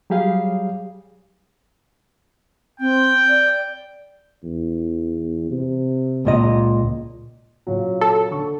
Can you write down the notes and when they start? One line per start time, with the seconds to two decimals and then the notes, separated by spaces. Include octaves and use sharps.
0.10 F#3 G3 G4 G#4 F5
2.80 C4 G5
3.29 D5
4.44 E2
5.51 C3
6.25 C#2 A#2 D#5
7.67 A#2 C#3 F#3
8.01 A4
8.31 D3 C#6